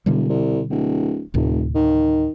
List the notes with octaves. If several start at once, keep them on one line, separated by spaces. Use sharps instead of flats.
E1 B2 D3 G3
C2
D1
F1 D2 A2 C3
D#3